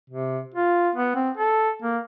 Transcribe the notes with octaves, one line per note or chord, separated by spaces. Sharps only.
C3
F4
B3
C4
A4
A#3